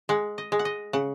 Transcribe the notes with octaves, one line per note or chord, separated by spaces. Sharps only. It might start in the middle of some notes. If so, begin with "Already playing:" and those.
G#3 F#5
D#5
G#3
F#5
D#5
C#3 F#5